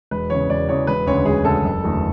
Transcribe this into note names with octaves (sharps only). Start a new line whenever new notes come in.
E1 B4
E2 C#3 C#5
E1 D5
E2 C#3 C#5
E1 B4
D2 C#3 C#5
E1 G#4
D2 C#3 A4
F#1
E2 D3 A3